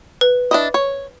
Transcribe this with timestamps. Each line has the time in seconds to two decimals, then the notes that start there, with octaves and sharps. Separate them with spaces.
0.21 B4
0.51 D4 E4 D#5
0.74 C#5